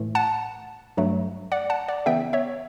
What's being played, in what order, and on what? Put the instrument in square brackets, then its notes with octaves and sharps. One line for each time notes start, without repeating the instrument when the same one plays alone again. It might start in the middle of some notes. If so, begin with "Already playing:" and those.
Already playing: [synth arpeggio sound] A2 E3 A3
F#5 A5
G2 F#3 A3
D5 F#5
F#5 A5
D5 F#5
C#3 E3 B3 E5 G5
C#5 E5